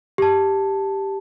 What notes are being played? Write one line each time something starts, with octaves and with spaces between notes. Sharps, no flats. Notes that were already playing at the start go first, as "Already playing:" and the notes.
G4 A5